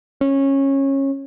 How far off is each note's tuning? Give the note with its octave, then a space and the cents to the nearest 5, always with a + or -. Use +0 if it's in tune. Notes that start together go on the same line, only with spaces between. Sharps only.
C#4 -20